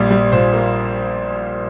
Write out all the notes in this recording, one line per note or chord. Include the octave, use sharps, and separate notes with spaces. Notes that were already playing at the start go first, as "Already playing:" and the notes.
Already playing: A#1 A#2 G3
G3
A#2 C5
A#3